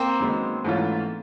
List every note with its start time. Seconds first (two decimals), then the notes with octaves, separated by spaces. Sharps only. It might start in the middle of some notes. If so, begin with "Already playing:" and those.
Already playing: A#3 C4
0.19 F#2 D#3 G#3 B3
0.64 G#2 E3 A3 C#4 F4